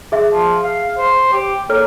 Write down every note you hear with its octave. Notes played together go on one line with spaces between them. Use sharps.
G#4 E5
F3
F5
C5
G4
A#3 A4 C#5 F6